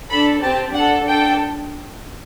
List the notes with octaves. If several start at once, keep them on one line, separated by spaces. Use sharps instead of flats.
D4 A4 B5
C4 G4 A5
D4 A4 F#5
D4 A4 G5